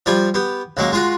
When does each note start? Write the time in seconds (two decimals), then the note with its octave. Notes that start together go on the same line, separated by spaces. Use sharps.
0.06 F3 G3 G4 G#5
0.34 B3 G4
0.77 C#2 F#3 G#3 A#3
0.92 G#3 F4 F#4